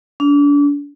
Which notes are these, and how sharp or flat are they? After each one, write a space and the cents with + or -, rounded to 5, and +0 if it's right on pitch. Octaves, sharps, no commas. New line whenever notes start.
D4 -35